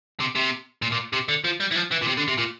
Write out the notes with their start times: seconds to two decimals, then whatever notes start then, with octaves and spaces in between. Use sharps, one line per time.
0.20 C3
0.35 C3
0.82 A#2
0.92 A#2
1.13 C3
1.29 D3
1.44 F3
1.60 G3
1.71 E3
1.75 F3
1.91 E3
2.02 A#2
2.07 C3
2.17 D3
2.28 C3
2.38 A#2